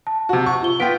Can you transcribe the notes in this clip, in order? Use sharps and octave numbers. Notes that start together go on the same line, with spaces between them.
A5
C3 F#4
C#6
F4 G7
B3 F4 F#5 G5 B6 D7